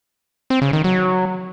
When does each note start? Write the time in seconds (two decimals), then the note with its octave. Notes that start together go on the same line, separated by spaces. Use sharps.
0.50 C4
0.62 C#3
0.73 D#3
0.84 F#3